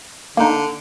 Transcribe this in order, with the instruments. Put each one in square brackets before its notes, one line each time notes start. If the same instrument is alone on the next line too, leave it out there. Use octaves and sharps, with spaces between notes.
[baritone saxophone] D3 [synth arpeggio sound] A#3 D#4